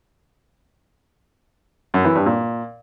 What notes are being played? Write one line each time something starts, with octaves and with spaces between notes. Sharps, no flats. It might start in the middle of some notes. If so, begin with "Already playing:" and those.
F#2
E3
G2
A#2